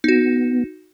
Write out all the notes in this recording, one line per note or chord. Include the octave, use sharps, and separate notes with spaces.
B3 D#4 F#4